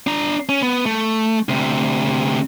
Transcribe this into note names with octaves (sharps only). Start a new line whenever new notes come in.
D4 A#5
C#4
B3
A3
D2 C3